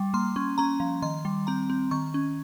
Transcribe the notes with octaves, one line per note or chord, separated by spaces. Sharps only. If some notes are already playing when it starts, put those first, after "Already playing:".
Already playing: G3
A#3 C6
C#4
C#4 A#5
F3
D#3 C6
G3
C4 A#5
C4
D#3 C#6
C#4